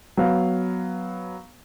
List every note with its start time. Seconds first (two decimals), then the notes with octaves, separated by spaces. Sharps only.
0.17 F#3 B3 F5